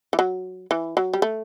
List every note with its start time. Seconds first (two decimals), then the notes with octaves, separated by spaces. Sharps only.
0.13 E3
0.19 F#3
0.71 E3
0.97 F#3
1.13 G3
1.22 A3